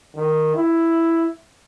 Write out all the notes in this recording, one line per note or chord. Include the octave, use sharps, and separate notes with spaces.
D#3
E4